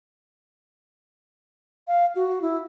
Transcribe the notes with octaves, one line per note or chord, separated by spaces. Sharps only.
F5
F#4
E4